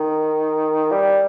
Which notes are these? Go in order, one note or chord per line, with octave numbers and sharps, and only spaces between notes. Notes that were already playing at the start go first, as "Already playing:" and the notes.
Already playing: D#3
G3